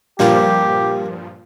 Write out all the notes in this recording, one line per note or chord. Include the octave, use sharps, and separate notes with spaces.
G2 A#2 F3 G3 A#3 G4